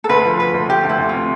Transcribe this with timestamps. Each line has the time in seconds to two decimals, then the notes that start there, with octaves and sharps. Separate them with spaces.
0.04 A4
0.09 D2 B4
0.25 F3
0.39 D2 B4
0.54 D2
0.68 D2 G4
0.84 D2
0.89 E4
0.98 D2
1.09 C3 F4